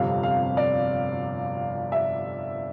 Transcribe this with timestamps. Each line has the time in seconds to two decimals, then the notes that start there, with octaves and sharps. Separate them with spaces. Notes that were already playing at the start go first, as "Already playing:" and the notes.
Already playing: G1 F2 C3 F5
0.23 F5
0.57 D5
1.92 E5